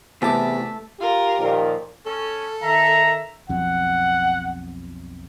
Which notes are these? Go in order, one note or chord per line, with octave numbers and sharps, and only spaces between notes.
E2 C3 A3 E5 A5 D6
F4 G4 A#4
A#2 D#3 F3
C#4 A4
D#3 E5 A#5
B1 F2 F#5